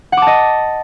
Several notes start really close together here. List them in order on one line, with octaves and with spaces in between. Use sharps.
F#5 D6 A5 D#5